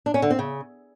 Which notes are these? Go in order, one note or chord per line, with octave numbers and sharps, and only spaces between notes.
D4
C#4
D3
C4
C#3